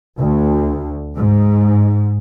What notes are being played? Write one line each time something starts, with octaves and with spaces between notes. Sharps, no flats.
D2
G#2